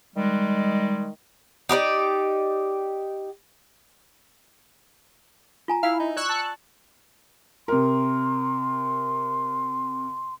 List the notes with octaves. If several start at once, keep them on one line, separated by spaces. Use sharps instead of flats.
D#3 G3 G#3
D#4 G4 A#4 D5
F4 G#5 A#5
E4 F5
D#4
D5 C#6 E6 F#6
A5
C3 A#4 C6